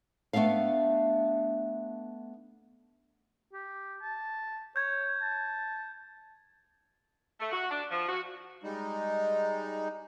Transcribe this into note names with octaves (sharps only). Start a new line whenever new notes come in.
A3 B3 D4 E5 F5
G4
A5
C#5 G6 G#6
A5
A3
F#4
D4
F3
F#4
G3 G#3 D#4